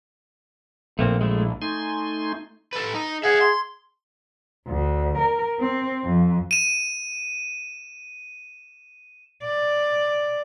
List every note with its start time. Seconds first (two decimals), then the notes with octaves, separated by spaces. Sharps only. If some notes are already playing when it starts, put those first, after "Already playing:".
0.99 A#1 A3 A#3 C4
1.21 G#3 A3 E4
1.62 A3 D#4 G#5 C6
2.73 A4 B4
2.94 D#4
3.23 G#4 E5 F#5
3.41 C6
4.68 D2
5.18 A#4
5.60 C4
6.05 F2
6.51 D#7 E7
9.44 D5